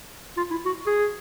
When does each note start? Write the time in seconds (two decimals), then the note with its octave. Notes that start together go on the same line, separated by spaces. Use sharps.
0.37 F4
0.51 E4
0.65 F#4
0.87 G#4